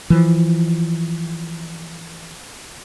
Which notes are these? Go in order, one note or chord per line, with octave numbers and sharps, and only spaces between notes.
E3 F3